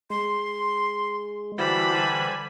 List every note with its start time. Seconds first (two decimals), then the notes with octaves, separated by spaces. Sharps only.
0.10 G#3 C6
1.58 D3 E3 G3 E4 F#4 C5 A5 B5
1.95 G#5